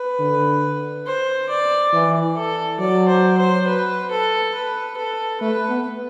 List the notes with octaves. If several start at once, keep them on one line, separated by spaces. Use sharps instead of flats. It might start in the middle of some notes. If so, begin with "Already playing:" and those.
Already playing: B4
D3
C5
D5
E3
A4
F#3 D5
C5
C5
B4
A4
B4
A4
A3 B4
B3